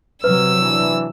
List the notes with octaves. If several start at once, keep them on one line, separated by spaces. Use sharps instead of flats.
C3 F#3 B4 E6
E3 D4